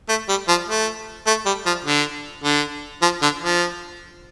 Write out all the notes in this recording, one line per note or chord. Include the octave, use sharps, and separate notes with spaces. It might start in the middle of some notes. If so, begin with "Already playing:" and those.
A3
G3
F3
A3
A3
G3
F3
D3
D3
F3
D3
F3